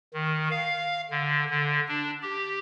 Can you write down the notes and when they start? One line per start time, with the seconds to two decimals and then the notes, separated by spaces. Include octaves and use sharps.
0.13 D#3
0.50 F5
1.11 D3
1.50 D3
1.88 D4
2.22 G4